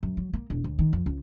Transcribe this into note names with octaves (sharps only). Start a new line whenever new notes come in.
F#2
F#3
A#3
E1
D2
D#3
F2
C#2